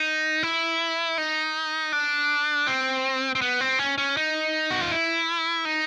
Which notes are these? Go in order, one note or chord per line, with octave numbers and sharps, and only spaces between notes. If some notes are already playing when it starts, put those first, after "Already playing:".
Already playing: D#4
E4
D#4
D4
C4
C4
B3
C4
C#4
C#4
D#4
F#4
F4
E4
D#4